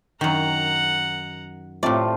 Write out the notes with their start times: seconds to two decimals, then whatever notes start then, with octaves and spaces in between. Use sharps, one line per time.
0.21 F#2 D#3 F#5 A#5
1.83 A2 C3 A3 F4 D5